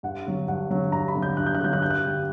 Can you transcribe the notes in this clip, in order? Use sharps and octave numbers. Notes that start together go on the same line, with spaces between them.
G2 F#5
D3 F#3
G2 F#5
D3 F#3
G2 A#5
B5
D3 F#3
G6
G2 F#6
G6
F#6
D3 F#3 G6
F#6
G2 G6
F#6
D3 G3